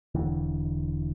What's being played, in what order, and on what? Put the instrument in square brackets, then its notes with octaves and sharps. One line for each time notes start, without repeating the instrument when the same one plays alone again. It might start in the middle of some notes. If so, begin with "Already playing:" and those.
[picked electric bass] E1 D2 E3